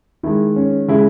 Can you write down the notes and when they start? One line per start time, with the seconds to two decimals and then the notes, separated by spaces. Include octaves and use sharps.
0.23 D#3 G#3 E4
0.56 C#4
0.88 C#3 G#3 E4